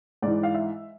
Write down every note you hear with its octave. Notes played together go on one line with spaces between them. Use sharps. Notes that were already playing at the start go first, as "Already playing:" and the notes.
G#2 E3 D5
F5
E5